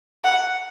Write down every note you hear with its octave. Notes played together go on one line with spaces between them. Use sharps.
F#5